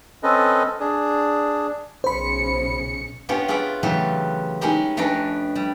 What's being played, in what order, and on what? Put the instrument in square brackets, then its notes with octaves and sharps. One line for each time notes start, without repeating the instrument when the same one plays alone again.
[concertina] C4 C#4 A4 B4 D#5
D4 G#4
[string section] B1 C#3 C#7 [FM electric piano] C5 B5
[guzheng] B3 C#4 D4 F4 G4 C#5
F4 G#4 B4 C#5 D5 E5
C#3 E3 F#3 A3 F4 G4
G#3 C#4 D#4 E4 G4 A#4
F2 A3 C#4 D4 B4 A#5
G3